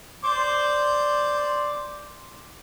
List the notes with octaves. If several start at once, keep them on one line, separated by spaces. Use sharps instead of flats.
C5 D5 D6